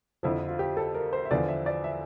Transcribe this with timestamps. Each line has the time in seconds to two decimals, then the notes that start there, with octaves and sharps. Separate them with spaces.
0.23 F2 D3 F3 E4
0.49 F4
0.59 G4
0.77 A4
0.94 A#4
1.13 C5
1.25 E5
1.31 E2 D3 F3 D5
1.48 E5
1.66 D5
1.84 E5